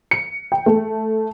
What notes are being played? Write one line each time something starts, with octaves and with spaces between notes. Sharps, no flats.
C#7
G5
A3